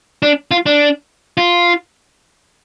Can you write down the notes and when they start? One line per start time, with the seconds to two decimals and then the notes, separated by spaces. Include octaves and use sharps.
0.22 D4
0.51 F4
0.66 D4
1.37 F4